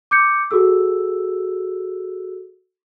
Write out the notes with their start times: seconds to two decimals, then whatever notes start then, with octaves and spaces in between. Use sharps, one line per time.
0.11 D6 G6 C#7
0.51 F#4 G#4 A4 E6